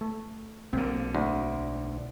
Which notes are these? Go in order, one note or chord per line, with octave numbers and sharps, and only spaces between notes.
A3
B1 D3 A#3 C4
D2